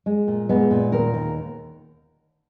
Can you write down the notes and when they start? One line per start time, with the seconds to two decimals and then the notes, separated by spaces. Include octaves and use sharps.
0.06 G#3
0.28 A#2
0.49 G#3 B3
0.71 A#2
0.92 D#2 A#4
1.14 D#2